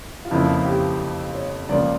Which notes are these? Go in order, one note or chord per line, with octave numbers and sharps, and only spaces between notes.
F4
F2 C#3 F3 A#3 E4
G4
C#5
C#2 C#3 F3 A#3 D5